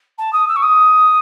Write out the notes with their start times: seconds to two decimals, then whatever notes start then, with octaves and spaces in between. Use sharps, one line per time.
0.18 A5
0.32 D#6
0.48 E6
0.56 C#6
0.62 D#6